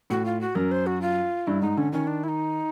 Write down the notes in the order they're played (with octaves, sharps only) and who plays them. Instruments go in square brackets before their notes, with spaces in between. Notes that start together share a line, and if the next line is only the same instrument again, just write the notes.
[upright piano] A2 [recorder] F#4
[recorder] F4
F#4
[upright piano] F#2 [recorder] A#4
[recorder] C5
F#4
F4
[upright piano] G2 [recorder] E4
[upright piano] G#2 [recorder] D#4
[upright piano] D3 [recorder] C#4
[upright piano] D#3 [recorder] C#4
[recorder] D4
E4
D#4